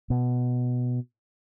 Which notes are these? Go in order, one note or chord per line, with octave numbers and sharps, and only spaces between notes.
B2